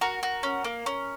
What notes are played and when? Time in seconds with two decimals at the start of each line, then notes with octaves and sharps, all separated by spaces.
0.01 F#4 A#4
0.23 F#4
0.43 C#4
0.65 A#3
0.86 C#4